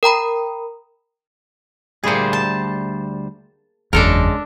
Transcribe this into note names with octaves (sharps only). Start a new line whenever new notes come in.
A#4 G5 A#5 B5
D2 A#2 G3 G#4 C5
A5
F#1 E2 C#3 G#3 D4 A4 A#4